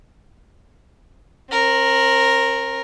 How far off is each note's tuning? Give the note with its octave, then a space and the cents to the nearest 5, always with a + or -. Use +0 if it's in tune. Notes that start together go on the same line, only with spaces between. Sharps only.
C4 +45 A#4 +0